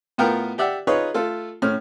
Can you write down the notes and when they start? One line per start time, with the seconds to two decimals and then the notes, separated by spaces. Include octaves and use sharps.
0.18 A2 B3 F4 A#4 G5
0.58 G4 D5 E5 F#5
0.87 D#4 F4 G#4 B4 C#5
1.14 A3 F4 A4
1.62 A2 C#4 F6